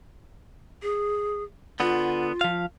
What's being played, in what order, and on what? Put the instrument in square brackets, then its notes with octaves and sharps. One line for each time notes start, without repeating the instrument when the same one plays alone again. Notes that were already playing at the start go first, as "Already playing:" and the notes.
[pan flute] G#4
[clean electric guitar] D3 B3 [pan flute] F4
[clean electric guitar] F3 F5